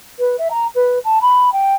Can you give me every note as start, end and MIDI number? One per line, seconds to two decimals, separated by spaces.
0.18 0.35 71
0.38 0.48 76
0.50 0.65 82
0.74 0.98 71
1.04 1.18 81
1.21 1.52 83
1.52 1.73 79